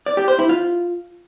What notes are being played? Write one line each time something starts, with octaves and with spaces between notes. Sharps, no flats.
D5
G4
C5
E4
F4